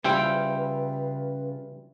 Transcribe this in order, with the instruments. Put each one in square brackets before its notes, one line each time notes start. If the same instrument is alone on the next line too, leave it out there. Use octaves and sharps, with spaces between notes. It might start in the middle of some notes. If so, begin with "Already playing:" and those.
[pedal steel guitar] C#3 F4 F5 [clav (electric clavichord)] G3 E4 C5 [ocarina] B4 [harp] G5